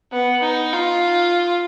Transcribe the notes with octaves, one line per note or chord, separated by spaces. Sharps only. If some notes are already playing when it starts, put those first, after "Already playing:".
B3
D#4
F4